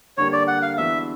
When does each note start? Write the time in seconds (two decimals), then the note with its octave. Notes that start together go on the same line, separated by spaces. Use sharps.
0.17 D3 G3 A#3 D4 G4 C#5
0.33 D5
0.47 F#5
0.62 F5
0.77 E3 G#3 B3 D4 F#4 E5